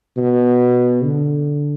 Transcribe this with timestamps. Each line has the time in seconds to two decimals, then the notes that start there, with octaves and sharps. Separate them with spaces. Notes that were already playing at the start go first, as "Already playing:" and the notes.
0.17 B2
1.04 D3